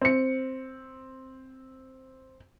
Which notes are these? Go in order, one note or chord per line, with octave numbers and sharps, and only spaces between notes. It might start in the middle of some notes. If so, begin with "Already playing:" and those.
C4 C#7